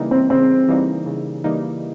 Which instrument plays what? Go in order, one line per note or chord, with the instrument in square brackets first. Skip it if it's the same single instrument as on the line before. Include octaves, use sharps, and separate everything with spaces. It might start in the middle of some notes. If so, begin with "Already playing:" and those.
Already playing: [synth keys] C#3 E3 G3 A#3 D#4
[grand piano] C4
[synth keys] C#3 [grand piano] C4
[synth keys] E3 G3 A#3 D#4
C#3
E3 G3 A#3 D#4